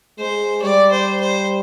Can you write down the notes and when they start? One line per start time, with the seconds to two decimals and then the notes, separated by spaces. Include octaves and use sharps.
0.19 G#3 C5
0.62 G3 D5
0.91 C5
1.20 C5